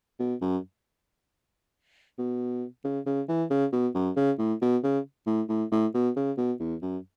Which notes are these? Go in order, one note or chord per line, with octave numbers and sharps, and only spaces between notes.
B2
F#2
B2
C#3
C#3
E3
C#3
B2
F#2
C#3
A2
B2
C#3
A2
A2
A2
B2
C#3
B2
E2
F#2